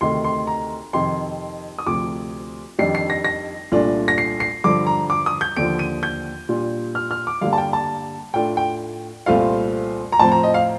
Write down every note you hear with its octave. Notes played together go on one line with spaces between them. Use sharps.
D2 C3 D#3 A3 C6
C6
A#5
F2 C3 D#3 C6
D#6
D2 C3 F3 D6
F2 D#3 G3 D4 C7
C7
A#6
A#6
C2 A#2 A3 D4 F4
A#6
C7
C7
G2 D3 F3 D6
A#5
D6
D#6
G6
D#2 D3 F3 D7
D#7
G6
A#2 G3 D4 F4
F6
F6
D6
G2 D3 G3 A#3 F5
A5
G5
A5
A2 A3 D4 F4 G5
G5
C2 A#2 A3 C4 F4 F5
A#5
A2 F3 C4 A5
A#5
D#5
F5